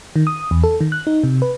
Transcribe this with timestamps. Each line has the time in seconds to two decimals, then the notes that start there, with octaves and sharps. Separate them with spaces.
0.16 D#3
0.27 D#6
0.51 E2
0.64 A4
0.81 D#3
0.92 F#6
1.07 D#4
1.24 C3
1.42 B4